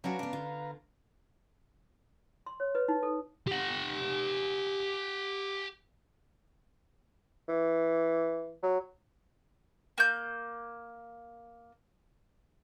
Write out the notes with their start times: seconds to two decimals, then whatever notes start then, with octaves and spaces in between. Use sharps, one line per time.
0.04 F#3 C#4 D4 F#4 B4 F5 A#5
0.19 C#3 B3 D4
0.33 D3 F4
2.46 C6
2.60 C#5
2.75 B4
2.88 D#4
3.03 A4
3.47 G4 F#5
7.48 E3
8.63 F#3
9.98 A#3 G6